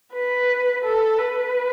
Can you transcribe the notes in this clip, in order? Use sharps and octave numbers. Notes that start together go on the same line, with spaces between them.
B4
A4
B4